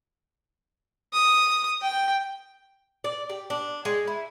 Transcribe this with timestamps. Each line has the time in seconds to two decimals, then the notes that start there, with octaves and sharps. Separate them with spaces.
1.13 D#6
1.82 G5
3.04 D5
3.30 G4
3.50 D4
3.85 G#3
4.07 E4